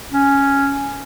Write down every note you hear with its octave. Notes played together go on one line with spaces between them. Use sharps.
C#4